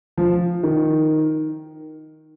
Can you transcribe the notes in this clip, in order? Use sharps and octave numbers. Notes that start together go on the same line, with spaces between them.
F3
D#3